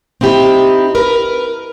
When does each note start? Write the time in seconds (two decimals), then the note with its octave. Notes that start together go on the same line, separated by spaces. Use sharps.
0.21 C4 D#4 E4 G4
0.95 A#4 B4